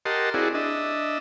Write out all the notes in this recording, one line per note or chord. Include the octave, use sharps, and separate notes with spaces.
G4 A#4 D#5 F#5 A5 C6
C4 E4 F#4 G#4 D5
D4 D#5 E5